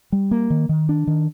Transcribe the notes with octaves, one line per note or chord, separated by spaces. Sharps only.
G3
A#3
D#3
D#3
D4
D#3